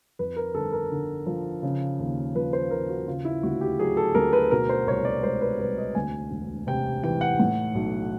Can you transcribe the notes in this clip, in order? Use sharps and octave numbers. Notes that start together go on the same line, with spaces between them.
F2 B4
A#4
G1 A4
A#4
D3
F3
C#3
D#2
F3 B4
C5
D#2 A#4
F#4
C#3 F4
E4
D2 F#4
G4
F#3 G#4
A4
D2 A#4
B4
B2 A#4
C5
C2 C#5
D5
G#3 C5
B4
C2 B4
D#5
D2 G#5
E1
C3 G5
E3 G5
F#5
A2
B1